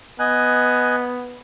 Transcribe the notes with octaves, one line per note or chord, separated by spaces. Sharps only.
B3 D#5 G#5 F#6